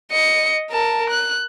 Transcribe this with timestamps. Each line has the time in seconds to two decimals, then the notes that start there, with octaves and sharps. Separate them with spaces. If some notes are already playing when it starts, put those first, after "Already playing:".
0.12 D#5 C#7
0.71 A#4 A5
1.10 F#6